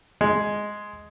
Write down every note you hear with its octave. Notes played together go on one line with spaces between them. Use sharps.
G#3